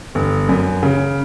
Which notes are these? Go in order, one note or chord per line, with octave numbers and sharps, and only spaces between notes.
G1
F#2
C#3